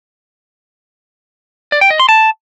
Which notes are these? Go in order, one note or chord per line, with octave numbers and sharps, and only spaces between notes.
D5
G5
D#5
C6
A5